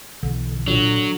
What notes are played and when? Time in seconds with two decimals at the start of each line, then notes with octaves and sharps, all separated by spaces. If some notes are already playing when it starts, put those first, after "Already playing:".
0.23 B1 B2 D3 E3
0.67 A#2 D3 F#3